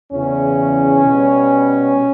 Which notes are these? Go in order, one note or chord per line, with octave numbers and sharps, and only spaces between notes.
E2 C#3 E3 C#4
B2 G3